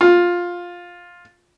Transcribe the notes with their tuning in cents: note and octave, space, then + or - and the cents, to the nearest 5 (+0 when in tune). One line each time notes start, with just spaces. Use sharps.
F4 +10